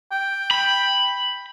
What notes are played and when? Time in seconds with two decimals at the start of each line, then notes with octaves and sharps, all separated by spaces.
0.12 G5
0.51 B5